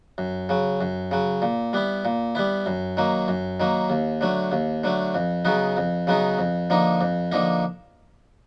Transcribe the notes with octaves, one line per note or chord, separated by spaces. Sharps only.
F#2
C#3 F#3
F#2
C#3 F#3
A#2
G3 B3 E4
A#2
G3 B3 E4
F#2
D#3 F#3 A#3
F#2
D#3 F#3 A#3
D#2
D3 F#3 A3
D#2
D3 F#3 A3
F2
C#3 F#3 B3 D#4
F2
C#3 F#3 B3 D#4
F2
D3 F3 A#3 D#4
F2
D3 F3 A#3 D#4